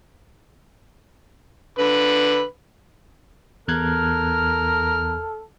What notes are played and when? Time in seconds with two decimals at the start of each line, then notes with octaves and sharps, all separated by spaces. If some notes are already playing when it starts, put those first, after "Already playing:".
1.79 D3 B4 B5
3.68 E2 A4 A#4 F6 F#6 G#6